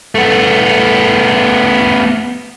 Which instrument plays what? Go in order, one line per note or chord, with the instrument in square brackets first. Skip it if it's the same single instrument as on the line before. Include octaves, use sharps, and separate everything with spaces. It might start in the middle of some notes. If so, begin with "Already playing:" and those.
[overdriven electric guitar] A3 B3